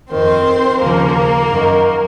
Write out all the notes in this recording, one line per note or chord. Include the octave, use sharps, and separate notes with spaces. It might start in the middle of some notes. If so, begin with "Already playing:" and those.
F2 D#3 C4 C5
D#2 C#3 F3 A#3 A#4
F#2 D#3